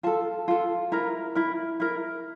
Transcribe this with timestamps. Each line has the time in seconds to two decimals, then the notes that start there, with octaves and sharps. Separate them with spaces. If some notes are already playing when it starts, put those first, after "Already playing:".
0.03 F4 A4 A5
0.48 F4 A4
0.92 E4 A#4 A#5
1.35 E4 A#4
1.80 E4 A#4